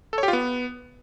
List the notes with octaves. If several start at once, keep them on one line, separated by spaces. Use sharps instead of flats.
A4
C#5
G4
F4
B3